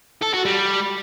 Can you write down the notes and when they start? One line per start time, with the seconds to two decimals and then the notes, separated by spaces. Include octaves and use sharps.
0.22 A4
0.34 F#4
0.45 G3